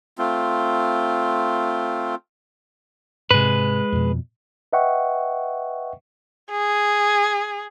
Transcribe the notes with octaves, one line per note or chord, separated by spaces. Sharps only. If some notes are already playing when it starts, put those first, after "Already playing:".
A3 C4 F4
G#2 C3 G#3 B4
F2 B2
B4 D#5 E5 F#5 G5 C#6
G#4